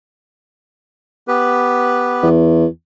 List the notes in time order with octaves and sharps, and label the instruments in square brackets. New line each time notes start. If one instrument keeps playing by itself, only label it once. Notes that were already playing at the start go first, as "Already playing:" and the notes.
[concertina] B3 G4 B4
[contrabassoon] E2